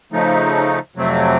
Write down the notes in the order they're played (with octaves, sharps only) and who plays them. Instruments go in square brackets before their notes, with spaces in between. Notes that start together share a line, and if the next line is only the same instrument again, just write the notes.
[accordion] C#3 F3 A3 D#4
F2 C3 F#3 A3 C4